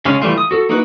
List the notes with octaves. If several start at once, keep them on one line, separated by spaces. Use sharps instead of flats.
C#3 G#3 C#4 F5
E3 G3 A3 F4
D#6
F#4 A4
A#3 D#4 E4 F#4 B4